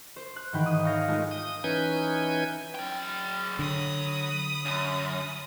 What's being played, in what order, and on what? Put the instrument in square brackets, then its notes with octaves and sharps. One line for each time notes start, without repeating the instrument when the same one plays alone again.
[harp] C5
F#6
G#2 D#3 E3 G5 B5
D#6
C#5 F5 G5 G6 A#6
G#3 A3 D#4 F4 A#4
[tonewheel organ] D#6
E3 C#4 D#4 B4 G6 G#6
[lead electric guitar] F#3 G5
[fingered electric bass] D3 [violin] B5 D#6
[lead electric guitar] F#2